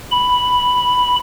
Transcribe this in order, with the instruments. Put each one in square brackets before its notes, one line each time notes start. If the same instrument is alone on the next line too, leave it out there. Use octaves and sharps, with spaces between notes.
[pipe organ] B5